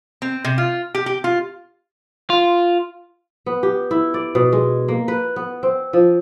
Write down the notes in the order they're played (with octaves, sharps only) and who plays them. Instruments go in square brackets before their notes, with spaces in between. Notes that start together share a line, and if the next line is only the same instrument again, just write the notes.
[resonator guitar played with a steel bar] C4
C3
F4
G4
G4
F4
[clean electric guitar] F4
[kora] B3
G4
E4
D5
B2
G#3
A#3
B4
B3
C4
F3